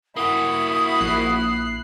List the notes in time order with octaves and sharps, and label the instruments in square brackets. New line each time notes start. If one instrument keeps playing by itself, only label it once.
[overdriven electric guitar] A#3 F#4 [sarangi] E4 [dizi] D#6
[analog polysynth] A#1 F#6 C7